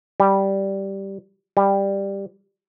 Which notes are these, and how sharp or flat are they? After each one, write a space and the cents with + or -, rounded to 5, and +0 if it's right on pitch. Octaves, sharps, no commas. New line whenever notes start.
G3 -5
G3 +10